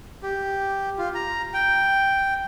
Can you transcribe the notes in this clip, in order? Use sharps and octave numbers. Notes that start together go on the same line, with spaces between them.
G4
F4
A#5
G5